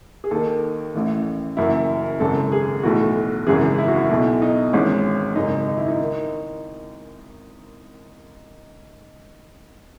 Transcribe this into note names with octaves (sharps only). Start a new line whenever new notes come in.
G#4
D#2 D#3 A4
A1 A2 E3
F#1 F#2 E3 E4
G#1 F#2 C#3 A4
G#4
B1 A2 E3 F#4
G#1 F#2 C#3 E3 G#4
E4
F#4
E4
B1 B2
D#4
G#1 G#2 E3 C#4
G#1 F#2 C#3 D#4
D#4
E4
D#4
D#3